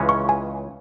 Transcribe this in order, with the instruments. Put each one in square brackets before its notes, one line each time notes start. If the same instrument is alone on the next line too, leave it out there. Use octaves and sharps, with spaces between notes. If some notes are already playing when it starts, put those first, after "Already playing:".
Already playing: [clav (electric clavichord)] C#2 C#3 E3 G#3 C#4
[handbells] C#6
G#5